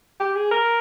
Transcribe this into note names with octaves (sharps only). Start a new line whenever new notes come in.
G4
G#4
A#4